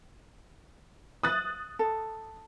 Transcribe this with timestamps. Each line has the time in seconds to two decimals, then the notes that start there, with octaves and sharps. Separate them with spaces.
1.23 D#6 F#6 A6
1.79 A4